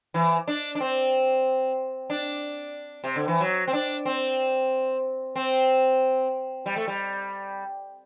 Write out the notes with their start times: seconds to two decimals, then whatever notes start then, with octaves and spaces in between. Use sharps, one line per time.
0.14 E3
0.48 D4
0.75 D4
0.80 C4
2.10 D4
3.04 C3
3.16 D3
3.28 E3
3.40 F#3
3.67 C4
3.73 D4
4.05 C4
5.36 C4
6.66 G3
6.76 A3
6.88 G3